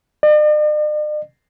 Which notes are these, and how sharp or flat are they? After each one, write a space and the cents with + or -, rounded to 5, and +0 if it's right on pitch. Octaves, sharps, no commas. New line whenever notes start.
D5 +45